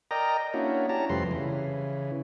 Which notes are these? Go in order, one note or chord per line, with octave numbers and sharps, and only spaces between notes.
A#4 D5 D#5 G5 A#5
A#3 C#4 D4 E4 F#4
C#4 G4 A5 A#5
F2 C3 G3 A3 B4 C6
C#3 E3